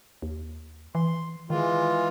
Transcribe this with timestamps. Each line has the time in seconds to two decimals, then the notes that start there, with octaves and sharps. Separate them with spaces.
0.22 D#2
0.95 E3 C6
1.50 D#3 E3 G#3 F4